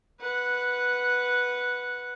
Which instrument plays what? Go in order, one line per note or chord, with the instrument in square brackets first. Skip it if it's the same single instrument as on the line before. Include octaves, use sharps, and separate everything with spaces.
[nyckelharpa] B4 F#5